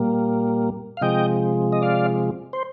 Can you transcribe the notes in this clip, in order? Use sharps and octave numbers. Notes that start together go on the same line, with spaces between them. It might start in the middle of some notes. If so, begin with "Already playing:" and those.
Already playing: A#2 G3 A#3
F5
C3 F3 G#3 D#5 G5
D#5
D5 F5
C5